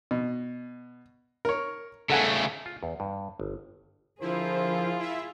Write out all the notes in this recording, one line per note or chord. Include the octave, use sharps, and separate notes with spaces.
B2
A#4 C#5
C#3 A3 A4 F#5 G#5
F4
E2
G2
G1
D3 F3 E4 F4 G#4 A#4 C5
E4 E5